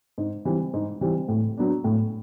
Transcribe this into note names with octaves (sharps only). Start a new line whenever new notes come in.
G#2
E3 G3 C4
G#2
E3 G3 C4
A2
F#3 B3 D4
A2